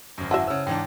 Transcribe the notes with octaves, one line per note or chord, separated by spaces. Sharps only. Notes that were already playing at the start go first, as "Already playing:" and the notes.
G#1 F#2
E4 F#4 E5 F#5 A5
C#3 C5 C#5 E6
G#2 E3 D4 G5